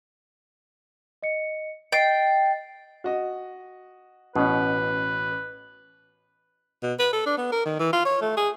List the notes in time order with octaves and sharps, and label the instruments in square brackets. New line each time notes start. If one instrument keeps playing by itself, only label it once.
[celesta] D#5 C#7
[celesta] D#5 A6 C7 [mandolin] G5
[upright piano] F#4 D#5
[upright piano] A1 C#4 [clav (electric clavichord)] B2 [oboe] B4
[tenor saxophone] B2
B4
A4
D4
B3
A#4
D#3
E3
F4
C#5
A3
G#4